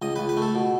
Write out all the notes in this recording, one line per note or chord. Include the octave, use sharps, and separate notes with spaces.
C#2 D#5
C#2 B4
B4
A3
A4
B2